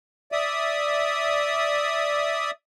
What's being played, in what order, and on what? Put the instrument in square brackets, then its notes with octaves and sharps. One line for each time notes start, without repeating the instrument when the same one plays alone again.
[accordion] D5 E5 D#6